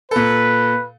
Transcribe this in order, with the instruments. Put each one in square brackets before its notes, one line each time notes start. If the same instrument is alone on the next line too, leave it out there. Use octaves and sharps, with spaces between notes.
[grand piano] A#2 A4 [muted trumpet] B4